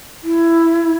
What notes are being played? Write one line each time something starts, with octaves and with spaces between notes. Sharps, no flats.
E4